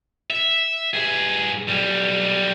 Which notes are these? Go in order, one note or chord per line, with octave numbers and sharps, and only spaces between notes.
E5
G2 G#4
B1 G3